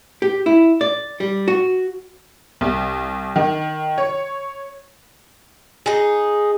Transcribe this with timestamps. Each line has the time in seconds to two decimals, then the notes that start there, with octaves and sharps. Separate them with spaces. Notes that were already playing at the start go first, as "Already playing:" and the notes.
0.22 G4
0.46 E4
0.81 D5
1.20 G3
1.48 F#4
2.61 C2
3.36 D#3
3.98 C#5
5.86 D#4 G#4